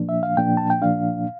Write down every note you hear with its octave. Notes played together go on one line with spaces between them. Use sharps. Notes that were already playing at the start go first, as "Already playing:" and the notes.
Already playing: A#2 F3 A#3 D4
E5
F5
A#2 F3 A#3 D4 G5
A5
G5
A#2 F3 A#3 D4 F5